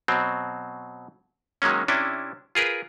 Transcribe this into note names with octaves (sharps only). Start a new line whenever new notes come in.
B2 F#3 C4
D#3 F#3 G#3 A#3 C#4
C3 C#4 D4 E4
F4 G#4 A#4 B4